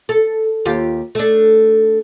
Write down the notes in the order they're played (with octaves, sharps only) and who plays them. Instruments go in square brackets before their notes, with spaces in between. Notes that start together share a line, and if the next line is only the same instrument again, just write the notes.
[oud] A4
D#2 F4 G4
A3 D4